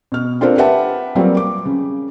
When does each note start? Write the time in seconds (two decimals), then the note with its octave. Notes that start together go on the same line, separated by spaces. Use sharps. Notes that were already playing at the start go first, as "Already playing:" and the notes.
0.12 B2 F6
0.41 C4 D4 F4 A4 A#4 C5
0.58 G4 B4 E5 F#5 G5 A5
1.15 F#3 G3 A#3 C4 F4
1.37 D6
1.65 C#3